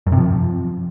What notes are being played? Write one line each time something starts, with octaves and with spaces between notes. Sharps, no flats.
F#2
C3
F3